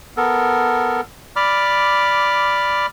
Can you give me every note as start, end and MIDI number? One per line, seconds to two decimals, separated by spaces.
0.17 1.01 59
0.17 1.01 69
0.17 1.01 70
1.36 2.86 74
1.36 2.86 83
1.36 2.86 86
1.36 2.86 89